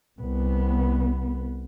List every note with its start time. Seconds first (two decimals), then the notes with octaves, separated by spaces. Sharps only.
0.19 C2 B3